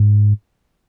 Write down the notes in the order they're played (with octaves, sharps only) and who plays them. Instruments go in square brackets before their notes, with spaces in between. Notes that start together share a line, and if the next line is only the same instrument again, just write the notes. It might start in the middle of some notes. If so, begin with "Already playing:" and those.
Already playing: [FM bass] G#2